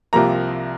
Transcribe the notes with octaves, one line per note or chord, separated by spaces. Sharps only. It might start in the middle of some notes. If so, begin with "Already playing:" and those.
C2 C3 F3 A#3 A#5